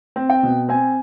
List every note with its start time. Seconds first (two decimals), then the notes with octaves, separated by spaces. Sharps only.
0.16 C4
0.29 G5
0.43 B2
0.68 C4 G#5